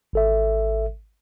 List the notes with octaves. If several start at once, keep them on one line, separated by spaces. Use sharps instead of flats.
G#1 A4 E5